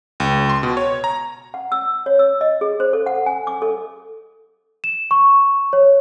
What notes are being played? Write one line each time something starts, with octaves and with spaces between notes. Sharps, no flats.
C#2
C6
B2
C#5
A#5
F#5
E6
C#5
E6
D#5
G#4
C5
A4
F#5
G#5
D6
A4
E7
C#6
C#5